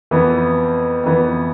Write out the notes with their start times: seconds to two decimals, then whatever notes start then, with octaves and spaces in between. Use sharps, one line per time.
0.11 F2 E3 B3
1.04 F2 E3 B3